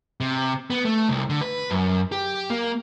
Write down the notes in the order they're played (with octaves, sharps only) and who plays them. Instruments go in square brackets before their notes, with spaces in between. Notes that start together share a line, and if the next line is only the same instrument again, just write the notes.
[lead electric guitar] C3
B3
A3
C2
D3
B4
F#2
G4
A#3